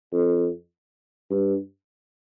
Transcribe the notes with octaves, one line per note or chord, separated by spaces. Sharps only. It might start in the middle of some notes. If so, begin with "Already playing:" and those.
F2
G2